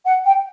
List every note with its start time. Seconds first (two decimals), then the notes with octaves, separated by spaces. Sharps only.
0.05 F#5
0.25 G5